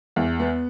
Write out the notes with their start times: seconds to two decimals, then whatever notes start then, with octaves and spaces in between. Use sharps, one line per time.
0.16 E2
0.40 B3